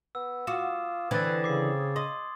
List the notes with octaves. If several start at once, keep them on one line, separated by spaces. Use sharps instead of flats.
B3 E6
F4 F#4 D6 D#6 E7
D3 E3 C4 D4 B4 G#6 A6
C#3 D6 C7
D#5 C6 D#6